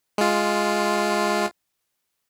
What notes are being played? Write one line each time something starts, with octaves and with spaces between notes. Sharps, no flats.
G#3 F4